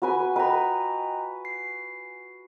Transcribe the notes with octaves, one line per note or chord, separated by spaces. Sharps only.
F#4 B4 G#5
B4 D#5 G5 A#5
C7